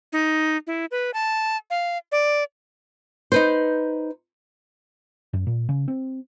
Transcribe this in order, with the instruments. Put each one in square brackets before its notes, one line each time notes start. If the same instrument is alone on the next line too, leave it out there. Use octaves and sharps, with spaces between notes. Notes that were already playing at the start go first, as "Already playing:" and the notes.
[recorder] D#4
E4
B4
A5
F5
D5
[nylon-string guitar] D#4 B4 C5
[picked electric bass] F#2
A#2
C#3
C4